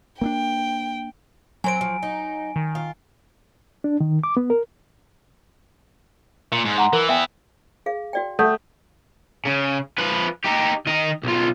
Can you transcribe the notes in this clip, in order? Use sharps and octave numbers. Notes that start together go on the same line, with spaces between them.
A#3 C4 D4 G5
F#3 C4 A#4 G#5 D7
F3
D#4
D#3
F4
D4
D#3
D6
B3
A#4
A#2 C#7
G#2
F#5 A#5 C6
E3 A#4
B3 E4 E5 G5 G#5
G#4 F5
F#4 D5 G5
A3 F#5 D#6 G6
C#3
F3 B4
D#4 G4
D#3 D#5
B1 F4